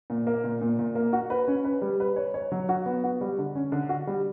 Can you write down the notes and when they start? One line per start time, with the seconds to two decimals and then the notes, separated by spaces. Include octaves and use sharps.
0.10 A#2
0.27 A#3
0.44 A#2
0.61 A#2
0.79 A#2
0.95 A#3
1.13 F#4
1.30 B4
1.48 C#4
1.65 B4
1.82 G3
2.00 B4
2.16 C#5
2.34 C#5
2.52 F#3
2.69 F#4
2.86 B3
3.04 F#4
3.21 G3
3.38 D3
3.55 C#4
3.72 D3
3.89 F#4
4.07 G3